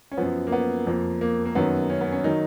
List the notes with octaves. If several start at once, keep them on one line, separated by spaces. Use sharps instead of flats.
C#4
F#2 F3 B3
A#3
B3
F2 F3 A#3
A#3
A#3
F#2 D#3 F#3 B3
C#4
B3
C#4
D#3 F#3 D#4